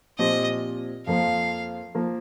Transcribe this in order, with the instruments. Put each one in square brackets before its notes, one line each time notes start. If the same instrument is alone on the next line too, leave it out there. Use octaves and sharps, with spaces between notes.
[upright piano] A#2 F3 C4 G4 [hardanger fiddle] D#5
[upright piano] F2 F3 A#3 [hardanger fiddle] F5
[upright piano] F3 A#3